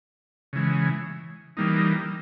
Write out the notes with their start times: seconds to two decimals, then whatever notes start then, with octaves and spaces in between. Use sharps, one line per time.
0.53 C#3 E3 G#3
1.57 E3 G3 A#3 D#4